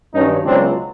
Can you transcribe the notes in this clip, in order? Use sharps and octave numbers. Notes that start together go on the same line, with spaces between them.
G2 D#3 F#3 C#4 D#4
C#2 B2 F#3 C4 D4